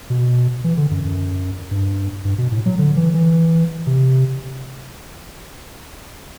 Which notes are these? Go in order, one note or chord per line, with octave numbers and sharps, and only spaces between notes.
B2
E3
D3
F#2
F#2
G2
G2
B2
A2
F#3
D3
E3
E3
C3